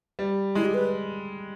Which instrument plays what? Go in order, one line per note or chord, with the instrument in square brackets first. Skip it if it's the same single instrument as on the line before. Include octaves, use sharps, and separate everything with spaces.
[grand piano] G3
[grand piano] G#3 [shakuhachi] E4
[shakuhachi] G4
B4